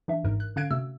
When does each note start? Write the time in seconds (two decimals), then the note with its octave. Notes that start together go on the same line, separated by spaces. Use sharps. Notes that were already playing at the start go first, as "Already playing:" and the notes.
0.08 E3 D4 E5
0.23 G#1 G#2 A#4
0.40 F#6
0.56 D3 C#4 F5 F#6 G#6 D7
0.71 C3 A3 F#4 E6